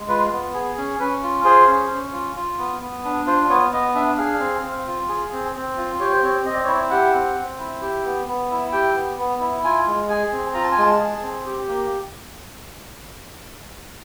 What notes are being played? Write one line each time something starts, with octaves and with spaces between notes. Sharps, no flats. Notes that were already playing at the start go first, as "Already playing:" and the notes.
Already playing: G#3
F4 B4
B3
G#4
C#4
C#4 B4
F4
G#4 C5
C#4
C#4
F4
F4
B3
B3
D4
F4 C5
B3 C#5
B3 D#5
D4 E5
G#4 F5
C4
C4
F4
G#4
C4
C4
F4
G4 C#5
C5
C4 C#5
C4 D#5
D5
E4 C#5
D5
G4 F#5
C4
C4
E4
G4
B3
B3
E4
G4 G5
B3
B3
E4
F4 G#5
G#3
G#4 G#5
C4
F4 A#5
A5
G#5
G#3 A5
G#4
C4
G4
A#3